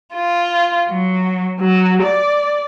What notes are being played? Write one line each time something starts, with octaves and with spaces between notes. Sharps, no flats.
F4
F#3
F#3
D5